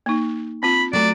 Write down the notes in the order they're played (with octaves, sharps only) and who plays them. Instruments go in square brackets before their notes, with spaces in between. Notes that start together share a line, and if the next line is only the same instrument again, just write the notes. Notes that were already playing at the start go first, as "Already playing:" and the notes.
[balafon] A#3 D#4
[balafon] C4 F4 [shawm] B5
[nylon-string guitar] F#3 A3 [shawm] D5